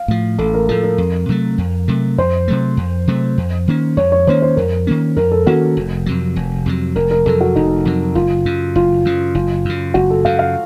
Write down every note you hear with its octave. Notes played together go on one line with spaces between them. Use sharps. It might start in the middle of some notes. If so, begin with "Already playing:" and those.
Already playing: F5
A2 F3
A1 A4
A#4
A2 F3 A4
A#4
F2
C3 F#3 A3
F2
C3 F#3 A3
F2 C5
C3 F#3 A3
F2
C3 F#3 A3
F2
D#3 A#3 C#4
F2 C#5
C#5
D#3 A#3 C#4 C5
C5
F2 A#4
D#3 A#3 C#4
F2 A#4
A4
D#3 A#3 C#4 F#4
F1
F2 C3 F#3
F1
F2 C3 F#3
F1 A#4
A#4
F2 C3 F#3 A4
F#4
F1 D#4
F2 C3 F#3
F#1 F4
F#2 C#3
F#1 F4
F#2 C#3
F#1 F4
F#2 C#3
F#1 F#4
A4
F#2 C#3 F5
F5